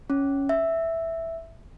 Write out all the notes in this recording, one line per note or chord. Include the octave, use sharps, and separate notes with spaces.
C#4
E5